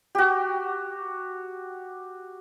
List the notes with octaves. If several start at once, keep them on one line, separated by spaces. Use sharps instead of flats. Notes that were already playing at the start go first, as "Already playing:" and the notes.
F#4 G4